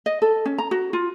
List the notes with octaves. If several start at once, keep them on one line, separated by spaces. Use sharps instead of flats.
D#5
A4
C#4
A#5
F#4
F4